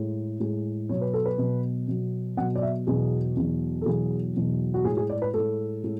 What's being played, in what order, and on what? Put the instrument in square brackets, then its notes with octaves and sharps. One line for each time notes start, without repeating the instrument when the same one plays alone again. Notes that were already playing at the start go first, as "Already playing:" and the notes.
Already playing: [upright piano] A2 G#3
A2 G#3
B2 F#3 C#5
B4
A4
B4
B2 F#3
B2 F#3
B2 F#3 F#5
D5
E5
E2 B2 F#3 G#4
E2 B2 F#3
A4
E2 B2 F#3 G#4
E2 B2 F#3
F#4
A2 G#3 G#4
G#4
D5
B4
A2 G#3 A4
A2 G#3